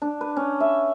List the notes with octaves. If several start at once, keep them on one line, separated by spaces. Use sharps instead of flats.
D4
B4
C#4
E5